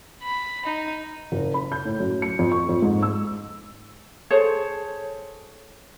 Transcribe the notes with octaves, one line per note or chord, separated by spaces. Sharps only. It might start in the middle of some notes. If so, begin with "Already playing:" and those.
B5
D#4
F#1
B5
G6
A2
F#2
C#7
F2
C#6
F2
G#2
E6
G#4 A4 C5 C#5